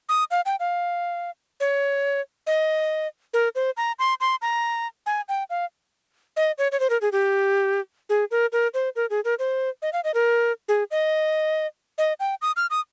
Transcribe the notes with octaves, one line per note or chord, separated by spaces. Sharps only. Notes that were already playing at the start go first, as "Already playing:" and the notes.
D#6
F5
G5
F5
C#5
D#5
A#4
C5
A#5
C6
C6
A#5
G#5
G5
F5
D#5
C#5
C#5
C5
A#4
G#4
G4
G#4
A#4
A#4
C5
A#4
G#4
A#4
C5
D#5
F5
D#5
A#4
G#4
D#5
D#5
G5
D#6
F6
D#6